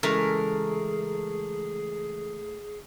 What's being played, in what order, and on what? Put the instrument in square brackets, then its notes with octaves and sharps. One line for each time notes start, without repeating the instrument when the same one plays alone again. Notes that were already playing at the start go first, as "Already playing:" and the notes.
[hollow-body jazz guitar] C#3 E3 G#3 [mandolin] A3 A#4 [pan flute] G#4